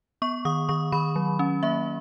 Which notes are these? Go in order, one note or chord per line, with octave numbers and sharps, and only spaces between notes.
B3 C#6
D#3 D#6
D#3 C#6
D#3 B5
F#3
C#4
A#3 E5